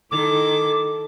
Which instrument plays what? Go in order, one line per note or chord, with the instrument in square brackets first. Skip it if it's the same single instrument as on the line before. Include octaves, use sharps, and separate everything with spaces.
[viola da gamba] D#3 E4 A4 [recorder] D6